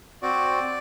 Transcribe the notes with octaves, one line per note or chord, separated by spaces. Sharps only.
C4 F#4 D5